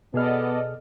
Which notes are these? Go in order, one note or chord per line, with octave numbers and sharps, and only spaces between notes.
B2 B3 G#4 A4 D5 D#5 F6